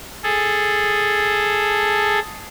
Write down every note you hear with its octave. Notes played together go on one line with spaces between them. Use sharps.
G#4 A4